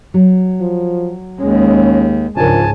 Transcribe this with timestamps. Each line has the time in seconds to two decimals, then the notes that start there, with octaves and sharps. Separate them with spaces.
0.14 F#3
0.61 F3
1.40 D#2 G#3 C#4
2.37 C#2 G#2 C#3 F3 D4 A#4 G#5 A5